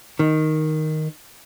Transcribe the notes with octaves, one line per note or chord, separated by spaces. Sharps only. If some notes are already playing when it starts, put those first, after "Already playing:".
D#3